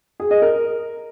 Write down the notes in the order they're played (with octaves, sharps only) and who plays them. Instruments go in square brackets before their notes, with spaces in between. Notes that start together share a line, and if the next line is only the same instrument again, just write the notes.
[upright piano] G#4
D#5
A#4